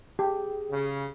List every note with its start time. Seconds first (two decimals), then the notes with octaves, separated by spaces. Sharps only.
0.19 G4 G#4
0.71 C#3